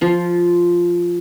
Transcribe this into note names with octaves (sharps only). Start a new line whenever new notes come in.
F3 F4